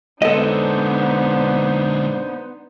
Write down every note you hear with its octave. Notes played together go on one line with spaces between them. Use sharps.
D3 G#3 B3 D4 D#4 A4 C5 D#5